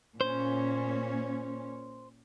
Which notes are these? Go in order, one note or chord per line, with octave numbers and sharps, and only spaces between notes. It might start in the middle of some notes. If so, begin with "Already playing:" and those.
A#2 C#4 C5